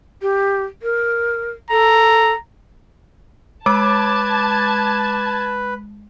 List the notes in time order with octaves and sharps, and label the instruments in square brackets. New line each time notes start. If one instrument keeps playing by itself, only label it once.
[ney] G4
A#4
[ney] A4 [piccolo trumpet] A#5
[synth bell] G#3 [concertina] B4 [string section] A5 G#6 [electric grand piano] D6